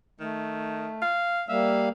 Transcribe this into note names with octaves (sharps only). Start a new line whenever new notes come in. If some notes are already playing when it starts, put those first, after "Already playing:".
D#3 A3
F5
G3 A#3 E5 F5